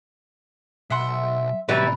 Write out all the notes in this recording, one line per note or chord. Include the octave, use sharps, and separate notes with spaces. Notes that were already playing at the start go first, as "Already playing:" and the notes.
B1 E5 F#5 C6
A2 C3 E3 F#3 G3 A#5 B5